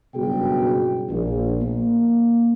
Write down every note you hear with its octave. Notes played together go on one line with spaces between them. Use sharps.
F#1 G2 B2 F#4 G#4 G5
A#1
A#3